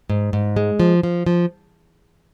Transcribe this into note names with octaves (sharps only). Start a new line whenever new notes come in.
G#2
G#2
G#3
F3
F3
F3